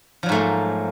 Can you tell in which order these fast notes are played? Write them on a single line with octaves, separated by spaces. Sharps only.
F3 F#3 G#2 A3 A#3